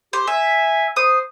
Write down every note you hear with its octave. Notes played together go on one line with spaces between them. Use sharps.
G4 C5
E5 G#5
C5 D#6